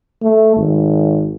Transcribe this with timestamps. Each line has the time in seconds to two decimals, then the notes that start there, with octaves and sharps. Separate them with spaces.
0.23 A3
0.57 G#1